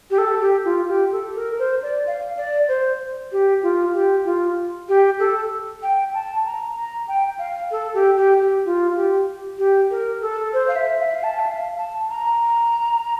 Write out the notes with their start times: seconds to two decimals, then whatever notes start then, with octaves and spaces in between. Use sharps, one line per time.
0.10 G4
0.18 A4
0.41 G4
0.65 F4
0.88 G4
1.12 A4
1.35 A#4
1.59 C5
1.82 D5
2.07 F5
2.37 D5
2.68 C5
3.32 G4
3.63 F4
3.94 G4
4.25 F4
4.88 G4
5.19 A4
5.82 G5
6.14 A5
6.46 A#5
6.76 A#5
7.08 G5
7.39 F5
7.71 A4
7.94 G4
8.17 G4
8.41 G4
8.65 F4
8.96 G4
9.58 G4
9.91 A#4
10.21 A4
10.53 C5
10.68 F5
10.76 E5
11.00 F5
11.07 E5
11.15 F5
11.23 A5
11.39 E5
11.46 F5
11.78 A5
12.09 A#5